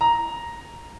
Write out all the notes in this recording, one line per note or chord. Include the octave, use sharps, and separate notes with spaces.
A#5